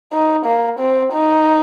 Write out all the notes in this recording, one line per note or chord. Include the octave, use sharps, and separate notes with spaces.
D#4
A#3
C4
D#4